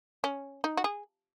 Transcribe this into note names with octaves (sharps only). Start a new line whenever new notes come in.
C#4
D#4
F#4
G#4